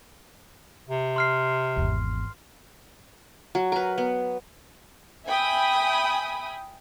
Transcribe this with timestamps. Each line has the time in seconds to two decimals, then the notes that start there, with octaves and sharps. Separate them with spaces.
0.89 C3
1.16 C6 F6 C7
1.76 G#1 E2
3.55 F#3
3.72 A#4 B4
3.98 B3
5.25 E5 G5 G#5 B5 D#6